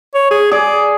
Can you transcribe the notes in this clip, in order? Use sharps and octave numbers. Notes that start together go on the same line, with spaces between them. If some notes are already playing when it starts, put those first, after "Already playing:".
C#5
G#4
G#4 D5